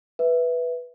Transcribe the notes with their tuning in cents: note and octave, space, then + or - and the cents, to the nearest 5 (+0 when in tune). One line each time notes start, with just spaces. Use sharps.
B4 +0 E5 +0